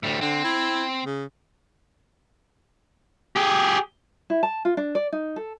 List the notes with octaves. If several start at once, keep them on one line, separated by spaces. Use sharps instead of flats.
D2 A2 G3
D3 C4
E4
C#3
G4 G#4
E4
A5
F4
D4
D5
D#4
A4